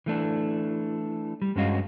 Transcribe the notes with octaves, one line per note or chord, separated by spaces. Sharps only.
E3 A3 D4
G3
G2 G#3 C#4 F#4 D#5 F5